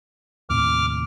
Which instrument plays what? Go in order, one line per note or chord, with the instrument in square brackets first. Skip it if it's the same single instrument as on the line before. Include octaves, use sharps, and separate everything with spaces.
[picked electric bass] D#2 A2 C3 [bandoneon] D6 F6